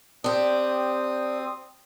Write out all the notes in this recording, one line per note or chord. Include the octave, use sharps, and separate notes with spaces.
C4 D4 G4 D#6